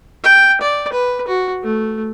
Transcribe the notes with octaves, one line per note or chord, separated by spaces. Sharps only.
G5
D5
B4
F#4
A3